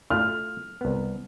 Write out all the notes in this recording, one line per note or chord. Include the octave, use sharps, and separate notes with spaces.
A3 E4 F4 F6
C2 B3